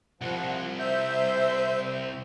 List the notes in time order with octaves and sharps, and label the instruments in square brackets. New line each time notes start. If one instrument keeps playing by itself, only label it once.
[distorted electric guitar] C2 [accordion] F3 F#5
[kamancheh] C5 [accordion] E5 G6